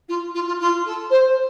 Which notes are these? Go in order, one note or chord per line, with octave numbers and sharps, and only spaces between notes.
F4
F4
F4
F4
A4
C5